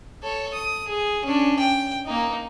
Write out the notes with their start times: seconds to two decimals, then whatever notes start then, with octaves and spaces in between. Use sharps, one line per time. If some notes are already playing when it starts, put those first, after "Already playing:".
0.23 A4 C#5
0.53 D#6
0.87 G#4
1.25 C#4 D4
1.59 G5
2.06 A#3 D#4